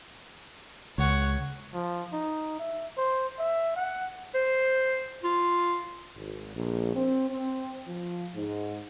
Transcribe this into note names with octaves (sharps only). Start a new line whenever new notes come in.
C#2 C#5 F#5
F3
D#4
E5
C5
E5
F#5
C5
F4
G#1
A#1
C4
C4
F3
G#2